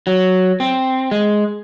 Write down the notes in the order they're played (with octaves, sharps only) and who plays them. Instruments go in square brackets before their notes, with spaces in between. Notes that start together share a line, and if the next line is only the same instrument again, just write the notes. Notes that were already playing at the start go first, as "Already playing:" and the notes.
[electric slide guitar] F#3
C4
G#3